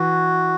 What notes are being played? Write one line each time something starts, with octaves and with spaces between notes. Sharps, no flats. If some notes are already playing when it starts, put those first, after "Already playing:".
Already playing: E3 F#4